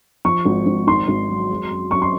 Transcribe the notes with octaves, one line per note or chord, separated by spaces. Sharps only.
F3 C#6
G#1
G#1
D#3 C6
G#1
F#3
G#3
F#2
F#2 C#6
C6